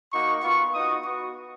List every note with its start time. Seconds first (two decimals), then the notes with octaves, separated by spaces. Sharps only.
0.12 A#3 D#4 F#4 C#6
0.43 B3 F4 C#6
0.74 B3 D#4 F#4 D#6
1.04 B3 F#4 C#6